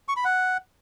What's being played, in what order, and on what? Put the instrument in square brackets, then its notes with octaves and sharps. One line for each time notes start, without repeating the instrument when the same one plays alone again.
[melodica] C#6
B5
F#5